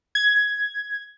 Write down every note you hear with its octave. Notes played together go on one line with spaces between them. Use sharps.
G#6